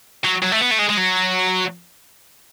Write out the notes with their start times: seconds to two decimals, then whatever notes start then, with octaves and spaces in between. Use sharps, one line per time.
0.25 F#3
0.43 F#3
0.52 A3
0.61 B3
0.71 A3
0.79 G#3
0.89 G#3
0.97 F#3